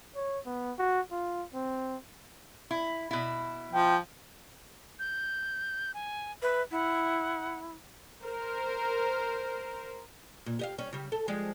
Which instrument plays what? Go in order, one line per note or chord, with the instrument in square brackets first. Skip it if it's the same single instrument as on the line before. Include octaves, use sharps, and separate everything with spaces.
[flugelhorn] C#5
B3
F#4
F4
C4
[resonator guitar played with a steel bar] E4
B2 E4
[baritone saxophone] F3 [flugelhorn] G5
[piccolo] G6
G#5
[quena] B4 [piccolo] E5
[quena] E4 [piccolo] F#5
[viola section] A#4 C5
[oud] A#2
G4 D#5 F5
G3 C#4
C#3 G3
A4
F3 G3 G#3